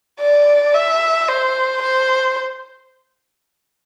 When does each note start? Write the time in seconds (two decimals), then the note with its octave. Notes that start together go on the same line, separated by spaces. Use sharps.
0.20 D5
0.74 E5
1.29 C5
1.82 C5